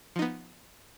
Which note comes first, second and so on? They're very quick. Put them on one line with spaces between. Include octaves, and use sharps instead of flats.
F3 D#4 B3